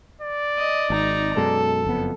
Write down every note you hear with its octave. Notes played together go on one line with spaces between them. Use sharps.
D5
D#5
G#1 D#4 A#5
F#2 B2 G#3 A4
F#1 F2 B3